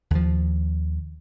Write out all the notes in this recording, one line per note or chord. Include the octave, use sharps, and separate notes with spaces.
D#2 F3